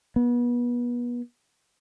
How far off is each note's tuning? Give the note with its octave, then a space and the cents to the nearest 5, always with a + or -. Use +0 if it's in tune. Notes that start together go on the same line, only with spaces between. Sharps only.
B3 -30